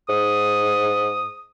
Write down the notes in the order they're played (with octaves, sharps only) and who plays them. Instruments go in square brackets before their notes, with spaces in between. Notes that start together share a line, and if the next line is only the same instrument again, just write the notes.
[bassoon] G#2 [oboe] D#6